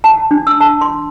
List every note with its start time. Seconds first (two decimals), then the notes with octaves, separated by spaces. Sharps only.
0.04 A5
0.31 D4
0.47 E6
0.60 A5
0.81 C6